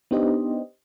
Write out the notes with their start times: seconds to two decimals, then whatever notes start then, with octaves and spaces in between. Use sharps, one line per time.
0.11 B3 D4 D#4 G4 C5 D#5